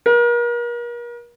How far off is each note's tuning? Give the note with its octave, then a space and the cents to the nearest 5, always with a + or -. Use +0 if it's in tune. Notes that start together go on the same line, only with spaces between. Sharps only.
A#4 +40